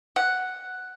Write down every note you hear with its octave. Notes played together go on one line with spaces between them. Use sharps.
F#5